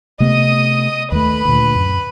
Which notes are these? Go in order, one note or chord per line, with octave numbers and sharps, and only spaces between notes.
C3 A3 B3 D#5 D#6
D#2 A3 B4 B5
D2 A#2
F#2